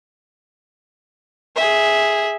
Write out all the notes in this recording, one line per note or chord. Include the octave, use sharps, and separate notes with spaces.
G#4 E5